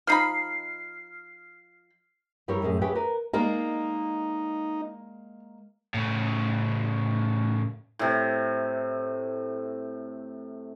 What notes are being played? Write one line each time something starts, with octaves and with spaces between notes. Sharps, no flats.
F3 D#4 B5 F6 C7
G2 G3 E4 G4 A#4 C#5
F#2 A2 G#3 C#4
G4 G#4 B4 C#5 E5 G5
A#4 B4
G#3 A#3 D#4 A#4 D5
A2 C#3
A2 C3